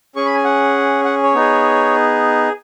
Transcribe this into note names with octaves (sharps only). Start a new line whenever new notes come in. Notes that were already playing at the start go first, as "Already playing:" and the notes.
C#4 G#4 C#6
B5
G#5
F#5
F#5
C#5
B3 D#4 G#4